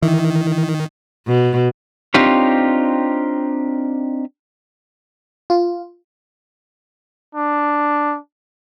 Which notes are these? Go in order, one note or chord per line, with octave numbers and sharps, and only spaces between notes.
D#3 E3
B2
C4 D4 D#4 F4 G4 C#5
F4
D4